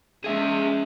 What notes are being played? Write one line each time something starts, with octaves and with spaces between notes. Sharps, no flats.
G#3 C#4 G#4 E5